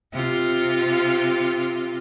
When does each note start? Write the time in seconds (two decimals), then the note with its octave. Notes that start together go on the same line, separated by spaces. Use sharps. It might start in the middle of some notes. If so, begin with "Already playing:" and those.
0.13 C3 F4